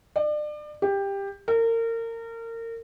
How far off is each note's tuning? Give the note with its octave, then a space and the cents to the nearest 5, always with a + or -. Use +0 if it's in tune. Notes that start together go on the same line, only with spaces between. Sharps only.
D5 +35
G4 +15
A#4 -30